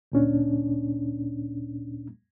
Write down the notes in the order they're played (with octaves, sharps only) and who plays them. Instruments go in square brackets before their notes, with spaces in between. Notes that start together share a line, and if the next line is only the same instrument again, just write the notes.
[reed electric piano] D2 A#2 C#4 D4